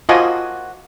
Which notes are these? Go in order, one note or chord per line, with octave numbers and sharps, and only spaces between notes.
F3 A#3 F4 F#4 D#5 G#5